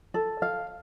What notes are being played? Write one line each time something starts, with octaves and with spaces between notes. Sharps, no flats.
A4
F5